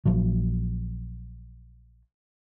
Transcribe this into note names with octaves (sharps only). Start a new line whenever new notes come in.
A#1 F3 F#3